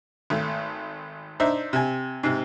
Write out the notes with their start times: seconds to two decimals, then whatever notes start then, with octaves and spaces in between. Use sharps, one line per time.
0.30 G#1 A3
1.40 D4 D#4 C5 E5
1.73 C3 G#5
2.23 G#2 C3